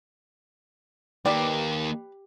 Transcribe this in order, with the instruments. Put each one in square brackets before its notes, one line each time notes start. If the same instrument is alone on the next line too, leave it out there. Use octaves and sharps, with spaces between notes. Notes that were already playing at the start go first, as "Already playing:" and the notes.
[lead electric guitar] D#3 A#3 [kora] G4 [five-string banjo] B4 D5